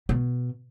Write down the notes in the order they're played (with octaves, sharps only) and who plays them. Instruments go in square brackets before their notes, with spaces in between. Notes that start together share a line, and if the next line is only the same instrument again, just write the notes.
[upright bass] B2